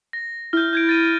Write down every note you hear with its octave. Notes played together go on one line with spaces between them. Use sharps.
A#6
E4 F6 G6
G6 G#6 D7
A6 D#7